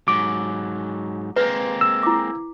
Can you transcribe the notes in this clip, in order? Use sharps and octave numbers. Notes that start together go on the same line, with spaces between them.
G#2 F#3 D6
G#3 A#3 C4 B4
E6
E4 D6